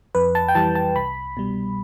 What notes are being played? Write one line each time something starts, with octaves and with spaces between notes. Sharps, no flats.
F2 B4
A5
G5
E3 G3 A5
A5
C2 B5
B2 G3